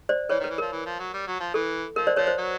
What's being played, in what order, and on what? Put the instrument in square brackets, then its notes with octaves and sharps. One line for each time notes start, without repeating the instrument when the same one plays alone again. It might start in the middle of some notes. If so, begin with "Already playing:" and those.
[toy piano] C5 D5
[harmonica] E3 [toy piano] B4 C#5
[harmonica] D#3
[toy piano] B4
[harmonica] E3
[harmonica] F3 [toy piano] A#4
[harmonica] E3
F3
F#3
G3
F#3
F3
[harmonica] E3 [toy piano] A4
[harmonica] F3 [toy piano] A#4
[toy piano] C5 D5
[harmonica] F3 [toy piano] B4 C#5
[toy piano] C5
[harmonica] F#3